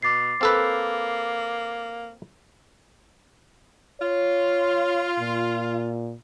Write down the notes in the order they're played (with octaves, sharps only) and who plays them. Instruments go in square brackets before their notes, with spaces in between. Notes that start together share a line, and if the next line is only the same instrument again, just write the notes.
[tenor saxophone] B2 [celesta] D6 A6 C7
[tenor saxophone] A#3 [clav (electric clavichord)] C4 A4 B4
[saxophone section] F4 [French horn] C#5
[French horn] A#2